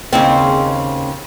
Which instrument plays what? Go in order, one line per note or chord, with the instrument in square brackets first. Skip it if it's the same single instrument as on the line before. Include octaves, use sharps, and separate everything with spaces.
[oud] D#2 C#3 C4